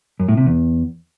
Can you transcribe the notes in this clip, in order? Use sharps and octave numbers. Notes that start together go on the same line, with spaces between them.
F#2
A2
C3
E2